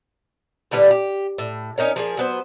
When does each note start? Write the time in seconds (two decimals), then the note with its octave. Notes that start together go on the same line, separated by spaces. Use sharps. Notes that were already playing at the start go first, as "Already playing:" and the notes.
0.71 A2 D3 G3 B4
0.91 G4
1.38 A2
1.78 C#4 D#4 A#4 C#5
1.96 F3 A#3 G#4
2.17 F#3 B3 C5